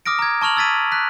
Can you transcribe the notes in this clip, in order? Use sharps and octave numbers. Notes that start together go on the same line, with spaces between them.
D6 D#6 F6 A#6 D7
A#5 G#6
A5 C#6 F6 F7 F#7
E6 G#6 A6 B6 D#7
F#6 B6